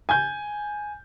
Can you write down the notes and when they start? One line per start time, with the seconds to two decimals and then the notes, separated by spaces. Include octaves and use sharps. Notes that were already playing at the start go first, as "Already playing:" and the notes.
0.09 G#5 G6